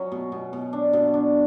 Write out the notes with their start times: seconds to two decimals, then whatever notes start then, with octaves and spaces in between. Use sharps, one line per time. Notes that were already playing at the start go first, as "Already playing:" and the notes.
Already playing: F#3 C#4 F#4
0.12 B2
0.32 B2
0.53 B2
0.73 D4
0.93 B2
1.14 D4